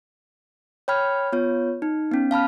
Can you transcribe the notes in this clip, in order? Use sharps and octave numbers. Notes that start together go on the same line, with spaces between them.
C#5 G5 B5 F6 G#6
B3 F4 C#5
D#4
B3 C#4
F5 A5 B5 F6